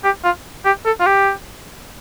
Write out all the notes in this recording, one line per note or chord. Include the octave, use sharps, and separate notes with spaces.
G4
F4
G4
A4
F4
G4